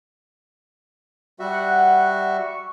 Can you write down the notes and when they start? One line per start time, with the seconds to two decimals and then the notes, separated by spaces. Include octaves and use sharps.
1.39 G3 F#4 E5 F#5
2.36 C#6